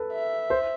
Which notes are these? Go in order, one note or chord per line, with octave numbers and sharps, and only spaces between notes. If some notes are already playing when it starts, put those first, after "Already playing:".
Already playing: A4 B4
E5
C5